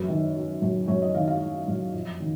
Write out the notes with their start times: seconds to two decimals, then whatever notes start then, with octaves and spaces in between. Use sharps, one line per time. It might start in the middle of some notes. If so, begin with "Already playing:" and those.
Already playing: F#2 B4
0.08 D#3
0.36 F#3
0.62 F#2
0.87 F#2 C#5
1.02 D#5
1.14 D#3 F5
1.28 F5
1.40 F#3
1.68 F#2
1.94 F2
2.20 D#3